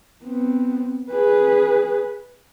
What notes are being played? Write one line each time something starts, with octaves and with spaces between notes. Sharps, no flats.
B3 C4
G#4 B4